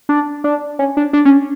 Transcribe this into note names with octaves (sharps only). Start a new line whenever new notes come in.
D4
D4
C#4
D4
D4
C#4